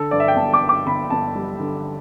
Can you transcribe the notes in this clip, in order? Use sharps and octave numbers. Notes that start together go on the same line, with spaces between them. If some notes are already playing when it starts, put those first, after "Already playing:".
Already playing: D3 A4
G2 D5
E5
G5
G1 A5
D6
G2
D6
G1 B5
G1 A5
G3
D3